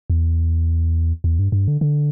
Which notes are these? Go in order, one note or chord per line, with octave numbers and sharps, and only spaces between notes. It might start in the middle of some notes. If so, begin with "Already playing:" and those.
E2
E2
G2
G2
D3
D3